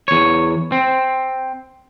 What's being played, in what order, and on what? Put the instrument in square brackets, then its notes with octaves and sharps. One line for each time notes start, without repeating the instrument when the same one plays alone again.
[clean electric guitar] E2 C#5
C4